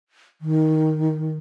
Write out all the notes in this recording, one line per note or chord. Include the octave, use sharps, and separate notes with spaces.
D#3